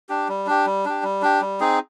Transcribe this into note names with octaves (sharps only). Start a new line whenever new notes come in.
D4 G4
G3
D4 G4
G3
D4 G4
G3
D4 G4
G3
C4 D#4 G#4